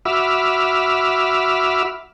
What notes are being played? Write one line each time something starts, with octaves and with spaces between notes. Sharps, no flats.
F#4 E5 B5 D6 E6 F6